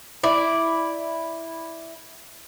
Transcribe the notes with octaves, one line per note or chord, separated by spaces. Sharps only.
E4 D5